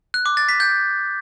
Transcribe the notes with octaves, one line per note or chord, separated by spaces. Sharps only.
F#6
D6
A6
B6
G6